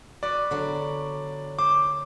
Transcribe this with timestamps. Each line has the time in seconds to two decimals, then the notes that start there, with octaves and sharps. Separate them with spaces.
0.23 F#4 B4 D5
0.51 D3 F#3 B3
1.59 C5 D6